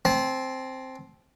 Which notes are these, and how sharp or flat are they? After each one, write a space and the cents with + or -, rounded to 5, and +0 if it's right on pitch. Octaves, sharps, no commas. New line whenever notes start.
C4 +0 A5 -30